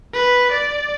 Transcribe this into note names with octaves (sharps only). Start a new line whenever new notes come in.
B4
D5